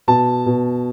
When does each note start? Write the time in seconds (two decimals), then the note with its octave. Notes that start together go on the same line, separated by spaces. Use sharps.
0.08 B2 A5
0.46 B2